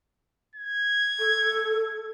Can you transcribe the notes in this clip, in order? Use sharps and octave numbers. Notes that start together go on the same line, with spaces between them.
G#6
A4